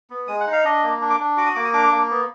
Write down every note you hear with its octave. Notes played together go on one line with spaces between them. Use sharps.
B3
G#3 D#6
F#5
D#4
F5
D4 D#5
A#3
D4
D6
D4
F#4 D6
D#6
A#3 D6
D#6
D4 D6
A#3
B3